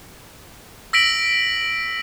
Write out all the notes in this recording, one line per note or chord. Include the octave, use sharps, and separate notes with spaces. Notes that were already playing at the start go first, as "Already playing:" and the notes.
E6 A#6 B6 D7 F#7